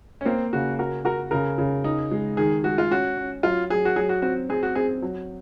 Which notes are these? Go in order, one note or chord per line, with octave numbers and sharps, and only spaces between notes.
C#4
A#3 C4
C#3 F#4
F#4 A#4
F#4 A#4
C#3 A#4
C#3
D#4
G#3
D#3 G#4
G#3 F#4
F4
C#4 F#4
C#4
F#3 F4
F#3 G#4
F#4
F#3 G#4
F#4
C4 F#4
C4 G#4
F#4
C4 G#4
F#3